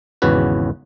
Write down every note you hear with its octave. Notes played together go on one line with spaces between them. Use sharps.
G#1 E2 C#3 F#4 B4